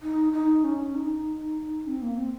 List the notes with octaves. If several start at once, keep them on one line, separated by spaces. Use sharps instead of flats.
D#4
D#4
C#4
D#4
C4
A#3
C4